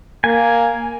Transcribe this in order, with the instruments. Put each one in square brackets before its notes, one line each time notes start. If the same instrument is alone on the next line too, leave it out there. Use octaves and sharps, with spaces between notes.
[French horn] A#3 [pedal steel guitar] G#5